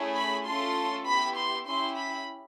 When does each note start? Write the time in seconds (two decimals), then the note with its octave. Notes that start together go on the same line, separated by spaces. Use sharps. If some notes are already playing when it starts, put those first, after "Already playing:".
Already playing: A3 C#4 E4 G#4
0.15 B5
0.45 A3 C#4 F4 A4 C6
1.07 B3 E4 G4 B5
1.37 C6
1.67 C#4 E4 G4 C6
1.98 B5